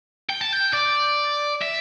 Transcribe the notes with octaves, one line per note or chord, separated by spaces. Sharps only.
G5
A5
G5
D5
E5